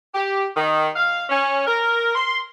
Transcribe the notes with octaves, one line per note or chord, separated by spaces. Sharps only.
G4
D#3
F5
C#4
A#4
C6